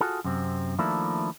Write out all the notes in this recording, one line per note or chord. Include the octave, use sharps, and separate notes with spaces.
F4 F#4 G#4 A4
F#2 C3 C4
D#3 F3 A3 A#3 D4 E4